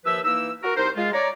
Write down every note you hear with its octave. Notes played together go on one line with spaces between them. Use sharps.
D#2 F3 B4 E5 E6
E3 A#3 D#4 E6
F#4 A#4
C2 D#4 A#4 C5
G#3 F4
C#5 D5 A#5